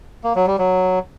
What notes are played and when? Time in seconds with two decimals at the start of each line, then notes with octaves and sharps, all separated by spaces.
0.24 A#3
0.35 F#3
0.47 G3
0.58 F#3